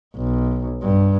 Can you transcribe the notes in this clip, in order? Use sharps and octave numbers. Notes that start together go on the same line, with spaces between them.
B1
G2